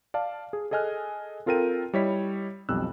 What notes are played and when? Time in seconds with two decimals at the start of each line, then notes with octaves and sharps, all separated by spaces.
0.14 D5 F5 A5
0.53 G#4
0.71 G#4 A4 D#5 G#5 F6 F#6
1.46 C4 F4 A4 A#4 G5 D#7
1.93 G3 E4 C#5 D#5 B6
2.69 B1 F2 G3 E6 F#6